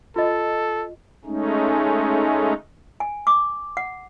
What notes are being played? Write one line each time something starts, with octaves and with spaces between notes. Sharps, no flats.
F4 A4 D#5
G#3 A3 C#4 D#4
G#5
D6
F#5